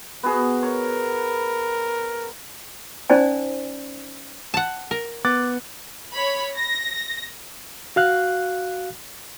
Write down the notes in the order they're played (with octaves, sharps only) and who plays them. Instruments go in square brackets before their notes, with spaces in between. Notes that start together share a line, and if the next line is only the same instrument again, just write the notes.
[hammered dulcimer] B3 F#4 G#4
[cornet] A#4 [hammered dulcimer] C#5
[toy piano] C#4 D#4 C5 D5 G#5
[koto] F#5 A5
A#4
[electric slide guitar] B3 [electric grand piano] D6 F#6 A6
[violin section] C#5 B5
A#6
[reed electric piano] F#4 F5 F#6